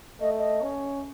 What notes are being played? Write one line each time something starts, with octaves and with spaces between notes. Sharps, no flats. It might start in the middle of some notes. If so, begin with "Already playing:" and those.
A3 D#5
D#5
C#4